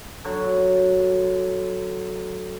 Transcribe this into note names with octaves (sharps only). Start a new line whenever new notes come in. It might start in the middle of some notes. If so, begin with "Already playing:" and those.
D3 F#3